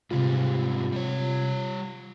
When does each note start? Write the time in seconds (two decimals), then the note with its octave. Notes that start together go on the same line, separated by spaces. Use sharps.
0.11 G#2 C3 G3 G#3 F4
0.92 G3 C#5